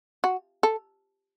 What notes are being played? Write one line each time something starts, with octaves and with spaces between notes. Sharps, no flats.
F#4
A4